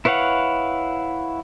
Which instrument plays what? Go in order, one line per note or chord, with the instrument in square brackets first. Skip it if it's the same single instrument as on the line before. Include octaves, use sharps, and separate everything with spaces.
[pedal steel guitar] E4 B4 C#5 F5 F#5